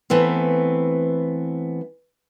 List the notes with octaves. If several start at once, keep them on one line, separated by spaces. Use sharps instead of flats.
E3 A3 B3 C4